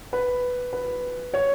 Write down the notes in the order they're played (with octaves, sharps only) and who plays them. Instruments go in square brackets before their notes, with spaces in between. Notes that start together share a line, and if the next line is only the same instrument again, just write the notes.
[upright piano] B4
B4
C#5